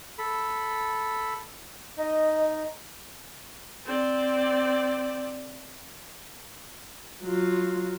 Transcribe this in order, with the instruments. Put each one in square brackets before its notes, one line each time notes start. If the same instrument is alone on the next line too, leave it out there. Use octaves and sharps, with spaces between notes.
[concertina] A4 B5
[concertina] D#4 [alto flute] D#5
[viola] C4 D5
F#3 F4